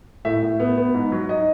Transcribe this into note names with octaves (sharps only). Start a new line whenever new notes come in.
A2 E5
A2
B3
B3
G#2
F#3
D#4 D#5